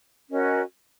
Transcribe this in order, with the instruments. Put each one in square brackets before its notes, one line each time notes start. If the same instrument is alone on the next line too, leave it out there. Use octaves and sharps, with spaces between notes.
[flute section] C#4 F#4 A#4 D#5